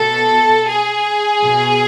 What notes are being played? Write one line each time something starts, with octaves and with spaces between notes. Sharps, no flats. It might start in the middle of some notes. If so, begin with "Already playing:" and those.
Already playing: B2 A4
G#4
B2